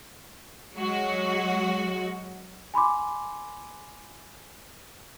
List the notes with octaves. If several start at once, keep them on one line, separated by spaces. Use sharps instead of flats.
F#3 G#3 F#4
G#5 B5 C6 D6